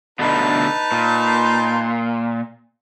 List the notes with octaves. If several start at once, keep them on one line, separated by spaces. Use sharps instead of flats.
B2 D3 A3 D#4 B4 A5
A#2 C6